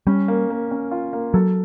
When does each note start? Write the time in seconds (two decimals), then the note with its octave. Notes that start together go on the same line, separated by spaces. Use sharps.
0.07 G3 C#4
0.28 A#3
0.50 A#3
0.71 C#4
0.91 F4
1.13 A#3
1.34 F#3 A4